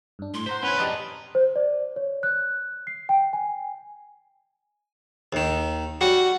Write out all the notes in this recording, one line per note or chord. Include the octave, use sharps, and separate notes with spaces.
G2 D4
A2 C6
C5 F#5 A#5 B6
C#4 E4 B4 F#5 G#6
D4 G4 A#4 D#5 A5
C5
D5
C#5
F#6
C7
G5
G#5
D#2 D#3
G3 F#4